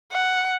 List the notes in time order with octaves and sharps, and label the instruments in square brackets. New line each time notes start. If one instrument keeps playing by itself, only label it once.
[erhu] F#5